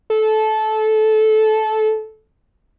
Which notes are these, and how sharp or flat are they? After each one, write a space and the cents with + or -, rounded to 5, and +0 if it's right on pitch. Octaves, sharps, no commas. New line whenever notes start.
A4 -20